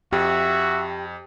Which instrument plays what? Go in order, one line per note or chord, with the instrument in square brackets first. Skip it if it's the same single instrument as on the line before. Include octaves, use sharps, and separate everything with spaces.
[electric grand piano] F2 [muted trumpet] F#4 [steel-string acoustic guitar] G4 [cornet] E5